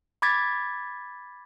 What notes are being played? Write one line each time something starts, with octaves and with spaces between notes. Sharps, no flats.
B5 D6 G#6 A6 B6